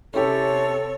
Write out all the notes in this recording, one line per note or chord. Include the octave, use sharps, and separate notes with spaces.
C3 C#4 E4 G4 A4 C#5